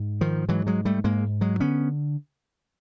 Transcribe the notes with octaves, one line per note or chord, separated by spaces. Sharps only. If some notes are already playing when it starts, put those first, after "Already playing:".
Already playing: G#2
D#3 F3
G#2 E3 F#3
F#3 G#3
G3 A3
G#2 G#3 A#3
F#3 G#3
D3 B3 C#4